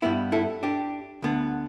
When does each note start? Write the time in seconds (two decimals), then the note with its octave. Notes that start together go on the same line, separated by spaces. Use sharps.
0.02 G2 G3 B3 E4
0.32 E4 A4
0.63 D4 G4
1.22 D2 D3 B3